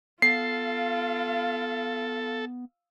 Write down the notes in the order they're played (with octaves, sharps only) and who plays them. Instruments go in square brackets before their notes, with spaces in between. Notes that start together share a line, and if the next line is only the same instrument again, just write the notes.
[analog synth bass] B3 [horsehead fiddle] F4 F5 [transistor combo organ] A4 [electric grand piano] C7